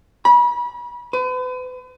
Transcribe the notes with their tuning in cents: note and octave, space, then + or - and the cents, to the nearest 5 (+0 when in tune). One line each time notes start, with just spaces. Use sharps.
B5 -35
B4 +40